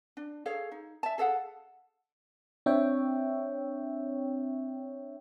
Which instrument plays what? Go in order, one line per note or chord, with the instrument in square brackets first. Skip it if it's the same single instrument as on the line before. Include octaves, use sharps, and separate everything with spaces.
[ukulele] D4
G#4 A4 C#5 F5
D#4
E5 A5
G#4 A4 F5 F#5
[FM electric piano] C4 D4 C#5 E5 G5